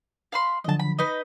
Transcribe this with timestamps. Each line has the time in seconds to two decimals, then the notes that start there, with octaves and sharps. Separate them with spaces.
0.32 F5 B5 C6
0.64 D3 F3 F#3 D#5 A5
0.80 B5
0.99 D#4 B4 D#5